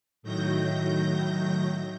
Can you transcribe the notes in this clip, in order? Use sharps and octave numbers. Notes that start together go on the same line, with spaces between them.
A2 D#3 F#3 G6 A#6